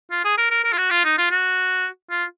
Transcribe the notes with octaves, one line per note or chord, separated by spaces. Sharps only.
F4
G#4
A#4
A#4
A#4
F4
F#4
F4
D#4
F4
F#4
F4